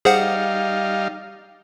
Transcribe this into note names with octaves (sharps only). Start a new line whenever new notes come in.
G3 D#4 G#4 C5 F5 F#5